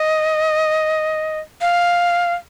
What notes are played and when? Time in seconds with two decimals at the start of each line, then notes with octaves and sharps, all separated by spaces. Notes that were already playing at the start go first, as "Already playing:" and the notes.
Already playing: D#5
1.61 F5